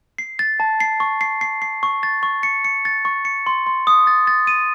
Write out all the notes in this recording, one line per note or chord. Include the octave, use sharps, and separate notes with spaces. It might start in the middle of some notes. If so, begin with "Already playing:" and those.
C7
A6
A5
C7
C#6
C7
C7
C7
C#6
A6
C#6
C#7
C#7
A6
C#6
C#7
C6
C6
D#6
A6
A6
D#7